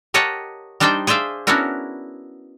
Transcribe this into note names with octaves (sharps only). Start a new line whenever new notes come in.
G4 A#4 C#5 D#5 F#5 A5
G3 D4 D#4 C5 D5 G5
G#4 C5 D5 E5 F5
B3 C#4 D4 E4 F#4 A#4